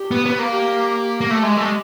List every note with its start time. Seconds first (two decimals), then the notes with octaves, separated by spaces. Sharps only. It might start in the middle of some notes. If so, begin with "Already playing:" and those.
Already playing: G4
0.11 B3
0.26 B3
0.39 A#3
0.52 G4
1.21 A#3
1.31 A3 G4
1.44 G#3
1.58 A3
1.66 G#3